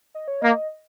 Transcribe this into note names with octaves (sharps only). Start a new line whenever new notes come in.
D#5
C#5
A#3 D#5